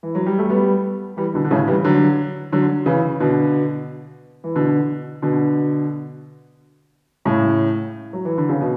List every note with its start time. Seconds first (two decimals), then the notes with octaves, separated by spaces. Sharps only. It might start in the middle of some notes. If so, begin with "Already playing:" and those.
0.03 E3
0.15 F#3
0.26 G3
0.39 A3
0.50 G3 B3
1.17 E3 G3
1.34 B2 D3
1.44 D3
1.51 A2 C#3
1.68 E3 G3
1.84 D3 F#3
2.52 D3 F#3
2.86 C#3 E3
3.20 B2 D3
4.44 E3
4.55 B2 D3
5.22 B2 D3
7.25 A2 C#3
8.13 F#3
8.25 E3
8.38 D3
8.49 C#3
8.61 B2